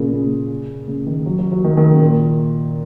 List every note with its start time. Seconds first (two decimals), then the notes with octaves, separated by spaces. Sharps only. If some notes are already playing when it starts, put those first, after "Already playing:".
Already playing: A#2 C#3
0.13 C#3
0.88 C#3
1.06 D#3
1.26 F#3
1.39 F#3
1.52 F#3
1.64 D#3
1.77 D#3
1.90 C#3
2.01 A#2